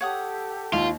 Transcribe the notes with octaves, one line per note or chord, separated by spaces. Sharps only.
G4 A4 C#5 F#5 D#6
D#2 F4